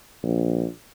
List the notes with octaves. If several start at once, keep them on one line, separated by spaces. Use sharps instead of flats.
A#1